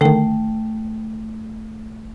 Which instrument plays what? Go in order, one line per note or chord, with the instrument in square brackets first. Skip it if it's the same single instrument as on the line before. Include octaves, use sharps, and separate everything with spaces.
[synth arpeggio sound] D3 D#3 [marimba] A3 G5